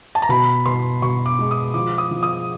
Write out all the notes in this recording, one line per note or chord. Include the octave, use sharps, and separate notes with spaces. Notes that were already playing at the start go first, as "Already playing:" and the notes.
A5
A#5
B2 B5
B2 C6
B2 C#6
D6
G#3
D#6
F3 D6
D#6
F3
D#6